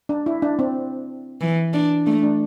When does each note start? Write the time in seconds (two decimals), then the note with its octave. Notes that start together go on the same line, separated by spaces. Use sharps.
0.09 D4
0.26 E4
0.42 D4
0.59 C4
1.41 E3
1.74 D4
2.06 A3 D4
2.23 D4